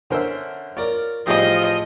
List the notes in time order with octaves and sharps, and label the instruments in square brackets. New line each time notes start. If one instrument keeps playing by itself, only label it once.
[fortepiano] D3 A#4 C5 [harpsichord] C#4 C#5 E5
[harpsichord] F4 A#4 [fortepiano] C#5 D5
[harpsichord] A1 G#4 G5 [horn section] F3 [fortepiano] G3 D#4 G4 [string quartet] D#5